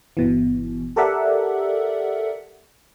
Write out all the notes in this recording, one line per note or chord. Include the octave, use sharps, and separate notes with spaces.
G1 B2 E3
G4 A4 A#4 D5 E5 F#5